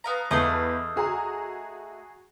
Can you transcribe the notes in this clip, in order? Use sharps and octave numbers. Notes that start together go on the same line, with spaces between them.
B3 F5 A#5
E2 A3 B4 D#5 F5
F#4 G#4 A#5